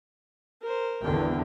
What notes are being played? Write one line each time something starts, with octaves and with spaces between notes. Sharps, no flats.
A#4 C5
G#1 E2 D3 G5